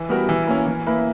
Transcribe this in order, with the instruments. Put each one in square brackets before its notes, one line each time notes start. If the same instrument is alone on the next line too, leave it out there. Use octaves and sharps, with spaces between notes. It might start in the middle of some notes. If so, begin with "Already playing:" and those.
Already playing: [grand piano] E3
G3 B3 F#4 A#4
E3
A#3 C#4
E3
A#3 E4 B4